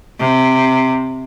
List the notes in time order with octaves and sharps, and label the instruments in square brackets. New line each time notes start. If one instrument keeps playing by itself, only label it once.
[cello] C3